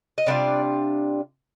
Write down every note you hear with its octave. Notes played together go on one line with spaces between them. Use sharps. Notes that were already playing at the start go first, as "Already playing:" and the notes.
D#5
C3 G3 D4 F4 D5